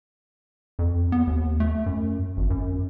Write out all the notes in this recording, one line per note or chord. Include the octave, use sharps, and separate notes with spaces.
F2
B3
D#2
A3
F#2
G#1
F#2